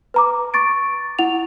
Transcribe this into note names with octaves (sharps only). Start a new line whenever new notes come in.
B4 A#5 D6
C#6 A6 D7
E4 F#5 F7